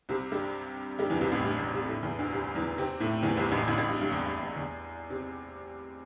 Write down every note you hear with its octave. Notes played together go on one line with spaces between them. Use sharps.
C2 C3
G2 G3
G2 G3
E2 E3
C2 C3
A1 A2
G2
A1 A2
C2 C3
G3
A2 A3
E2 E3
D2 D3
C2 C3
E2 E3
C3 C4
A2 A3
E2 E3
C2 C3
A1 A2
A1 A2
A1 A2
G2
G2
E2
G2
E2
E2
C3